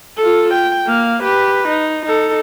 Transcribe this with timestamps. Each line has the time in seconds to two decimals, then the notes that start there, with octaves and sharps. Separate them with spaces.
0.18 F4 A4
0.54 G5
0.87 A#3 F5
1.23 G4 B4
1.68 D#4
2.06 D#4 A4